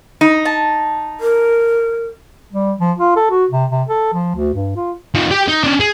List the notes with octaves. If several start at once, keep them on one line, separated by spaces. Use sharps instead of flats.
D#4
A5
A#4
G3
F3
F4
A4
F#4
C3
C3
A4
F3
D2
G2
F4
F3 D#4
G4 G5
D#4
C#4 D4
G#4